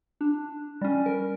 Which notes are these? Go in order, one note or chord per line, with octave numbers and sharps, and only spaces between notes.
D4
G3 C#4
A#4